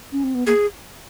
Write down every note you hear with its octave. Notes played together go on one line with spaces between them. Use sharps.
C#4
C4
B3
A#3 G#4